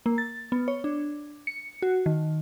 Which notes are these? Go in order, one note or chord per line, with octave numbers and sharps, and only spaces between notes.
A#3
A6
B3
C#5
D4
C#7
F#4
D#3